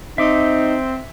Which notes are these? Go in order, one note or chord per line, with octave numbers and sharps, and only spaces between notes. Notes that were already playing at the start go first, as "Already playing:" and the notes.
C4 D#4 E5 D6